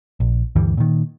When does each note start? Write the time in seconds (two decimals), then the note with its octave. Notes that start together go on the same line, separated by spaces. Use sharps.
0.20 A#1
0.56 D2 G2 E3 G3
0.77 A#2 D#3